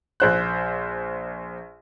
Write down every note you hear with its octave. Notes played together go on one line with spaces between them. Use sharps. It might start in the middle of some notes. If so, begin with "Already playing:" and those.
A#1 C5 F#6